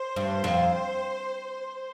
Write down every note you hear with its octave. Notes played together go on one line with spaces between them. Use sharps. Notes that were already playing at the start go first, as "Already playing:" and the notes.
Already playing: C5
G2
F2